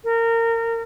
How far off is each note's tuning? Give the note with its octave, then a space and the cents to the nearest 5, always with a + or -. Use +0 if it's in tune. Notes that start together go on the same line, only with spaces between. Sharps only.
A#4 -25